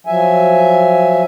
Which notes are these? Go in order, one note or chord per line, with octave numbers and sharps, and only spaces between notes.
F3 F#3 E5 G#5